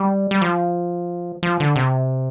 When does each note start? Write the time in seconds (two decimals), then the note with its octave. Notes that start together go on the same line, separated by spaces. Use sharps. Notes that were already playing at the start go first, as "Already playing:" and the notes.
Already playing: G3
0.31 G3
0.42 F3
1.43 F3
1.60 D3
1.76 C3